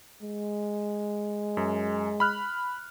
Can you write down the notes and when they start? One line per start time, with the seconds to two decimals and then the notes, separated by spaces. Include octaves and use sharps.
0.22 G#3
1.57 F#2
2.20 B5 F6 F#6